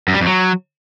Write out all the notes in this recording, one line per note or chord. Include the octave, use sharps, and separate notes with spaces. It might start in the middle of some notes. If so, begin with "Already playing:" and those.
F#2
G3
F2
F#3